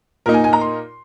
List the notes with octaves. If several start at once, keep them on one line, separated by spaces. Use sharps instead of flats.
A#2 A#3 D#4 A#4
G#5
G#5
A#5
C6